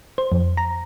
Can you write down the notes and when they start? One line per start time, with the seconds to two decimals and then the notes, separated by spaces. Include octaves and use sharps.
0.18 C5
0.32 F2
0.57 A#5